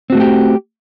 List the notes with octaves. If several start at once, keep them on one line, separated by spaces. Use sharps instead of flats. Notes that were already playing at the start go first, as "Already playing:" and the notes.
A3 C4 F#4 G4 A#4